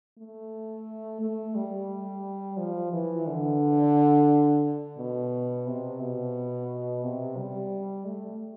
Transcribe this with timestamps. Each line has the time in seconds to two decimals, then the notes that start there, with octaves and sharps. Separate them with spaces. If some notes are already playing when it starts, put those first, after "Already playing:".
0.18 A3
1.21 A3
1.55 G3
2.58 F3
2.92 E3
3.27 D3
4.98 B2
5.66 C3
6.00 B2
7.03 C3
7.37 G3
8.05 A3